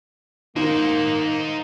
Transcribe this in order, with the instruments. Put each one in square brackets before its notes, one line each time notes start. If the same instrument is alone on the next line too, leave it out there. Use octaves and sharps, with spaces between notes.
[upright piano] D#3 [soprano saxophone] A#3 [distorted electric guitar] D#4 C5